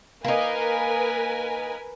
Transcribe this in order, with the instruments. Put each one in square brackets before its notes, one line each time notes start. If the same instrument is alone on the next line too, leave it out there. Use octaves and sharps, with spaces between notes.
[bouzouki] A#3 D#4 [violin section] A#4 B4 G#5